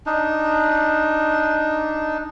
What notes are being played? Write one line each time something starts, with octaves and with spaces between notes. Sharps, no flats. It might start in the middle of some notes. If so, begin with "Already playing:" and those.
D4 D#4